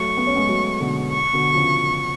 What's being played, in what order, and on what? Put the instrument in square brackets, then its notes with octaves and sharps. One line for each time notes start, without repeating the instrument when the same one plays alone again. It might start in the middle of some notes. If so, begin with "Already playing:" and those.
Already playing: [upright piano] F#3 A3 [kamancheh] C#6
[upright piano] B3
C#4
G#3 B3
F#3 A3
B2 D3
[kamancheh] C#6
[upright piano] B2 D3
C#3 F3